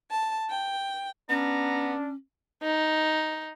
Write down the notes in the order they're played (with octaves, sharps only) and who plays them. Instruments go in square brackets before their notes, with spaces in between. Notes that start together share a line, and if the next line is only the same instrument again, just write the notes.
[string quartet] A5
G5
[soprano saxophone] B3 [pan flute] C#4 [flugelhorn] D4 [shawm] A#5
[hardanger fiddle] D#4